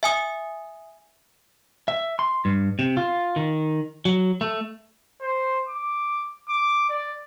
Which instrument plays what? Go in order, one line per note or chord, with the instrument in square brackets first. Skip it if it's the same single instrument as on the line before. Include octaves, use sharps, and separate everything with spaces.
[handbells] E5 G#5 D#6
[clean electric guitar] E5
C6
G2
C3
F4
D#3
F#3
A3
[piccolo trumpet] C5
D6
D6
D5